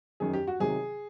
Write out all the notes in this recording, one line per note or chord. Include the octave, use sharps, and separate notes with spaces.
F#2 D#3 F#3 G#4
G4
F#4
C3 D#3 F#3 G#4